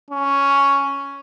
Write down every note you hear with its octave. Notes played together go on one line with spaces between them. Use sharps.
C#4